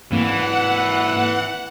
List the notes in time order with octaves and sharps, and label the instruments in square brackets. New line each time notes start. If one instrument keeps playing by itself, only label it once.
[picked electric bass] G#2 A#3 C4 [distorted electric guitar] E3 [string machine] F#5